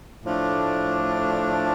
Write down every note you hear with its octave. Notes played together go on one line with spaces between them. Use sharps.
A2 F3 A3 D4